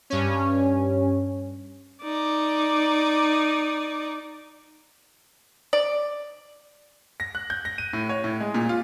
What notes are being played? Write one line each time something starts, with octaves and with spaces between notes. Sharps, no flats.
G2 C#4
D#4 D5
D5
A#6
F#6
G6
A#6
D#7
A2
C#5
A2
G#3
A#2
F4